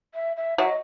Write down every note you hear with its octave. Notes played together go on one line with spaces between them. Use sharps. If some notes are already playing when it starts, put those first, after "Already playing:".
E5
E5
F#3 E5
D#5